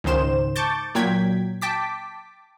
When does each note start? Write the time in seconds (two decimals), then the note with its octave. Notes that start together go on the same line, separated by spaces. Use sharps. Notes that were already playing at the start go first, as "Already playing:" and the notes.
0.04 C#2 G#2 D#3 C5 E7
0.56 A5 C#6 D6 G6 A6
0.95 A#2 F#3 G5 G#6 B6
1.62 G5 A5 D6 B6